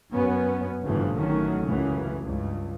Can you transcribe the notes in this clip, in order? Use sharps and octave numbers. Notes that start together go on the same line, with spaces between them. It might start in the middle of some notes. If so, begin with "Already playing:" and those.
F#2 B3 C#4
G1 D2 A2 C#3 E3 F3
A1 D#3 F#3 A3 C#4
C#2 F#2 C#3 E3 A3
C#2 G2